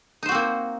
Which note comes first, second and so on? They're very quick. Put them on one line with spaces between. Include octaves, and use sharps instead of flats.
D#4 C5 F#4 C4 A#3